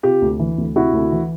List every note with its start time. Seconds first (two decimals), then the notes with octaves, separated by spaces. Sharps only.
0.03 C3 F4 G4
0.22 D2
0.39 E3
0.58 D2
0.75 C3 E4 F#4
0.93 D2
1.12 E3